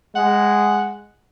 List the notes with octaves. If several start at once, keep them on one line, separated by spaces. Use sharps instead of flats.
G#3 F#5